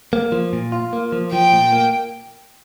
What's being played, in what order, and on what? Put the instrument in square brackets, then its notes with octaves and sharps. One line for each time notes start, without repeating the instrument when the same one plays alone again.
[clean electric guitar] A#3
F3
A#2
F4
A#3
F3
[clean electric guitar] F3 [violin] G5
[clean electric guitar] A#2
A#3